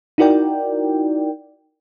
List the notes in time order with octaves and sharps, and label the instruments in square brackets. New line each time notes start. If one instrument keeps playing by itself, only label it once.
[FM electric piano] D#4 E4 F#4 A#4 D5 G5